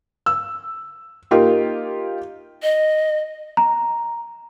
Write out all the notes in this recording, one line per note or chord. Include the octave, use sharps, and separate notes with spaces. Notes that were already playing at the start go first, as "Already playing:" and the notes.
E6
A#3 D#4 F4 G4
D#5
A#5